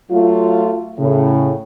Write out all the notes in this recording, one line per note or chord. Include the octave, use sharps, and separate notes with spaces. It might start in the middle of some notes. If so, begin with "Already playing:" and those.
F#3 A3 F4
A2 C#3